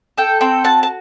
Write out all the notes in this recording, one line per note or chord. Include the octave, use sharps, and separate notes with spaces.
A4 G5
C4 G5
F#4 A5
A5